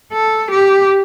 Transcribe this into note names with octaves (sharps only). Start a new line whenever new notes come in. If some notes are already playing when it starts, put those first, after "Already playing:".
A4
G4